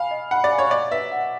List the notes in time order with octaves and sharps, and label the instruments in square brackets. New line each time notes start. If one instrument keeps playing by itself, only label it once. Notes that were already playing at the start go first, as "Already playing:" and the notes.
Already playing: [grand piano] F5 [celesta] G#5 B5
[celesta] D#5
[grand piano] F#5 [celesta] B5
[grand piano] D5
[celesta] G#5
[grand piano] C#5
[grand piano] D5 [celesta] D#5
[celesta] B4 [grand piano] E5
[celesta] F#5